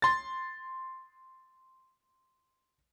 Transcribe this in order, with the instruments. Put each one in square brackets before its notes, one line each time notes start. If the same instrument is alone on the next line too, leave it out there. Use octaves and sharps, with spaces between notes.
[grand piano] C6 A6